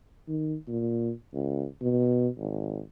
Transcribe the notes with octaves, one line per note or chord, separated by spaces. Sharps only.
D#3
A#2
C#2
B2
G#1